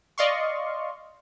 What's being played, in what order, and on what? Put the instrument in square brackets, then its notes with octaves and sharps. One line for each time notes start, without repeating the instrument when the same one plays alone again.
[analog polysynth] D5 D#5 F5 C6 C#6